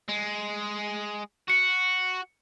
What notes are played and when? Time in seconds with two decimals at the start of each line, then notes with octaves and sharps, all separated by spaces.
0.08 G#3
1.50 F#4 C#7